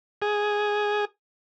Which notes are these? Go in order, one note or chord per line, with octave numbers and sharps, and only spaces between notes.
G#4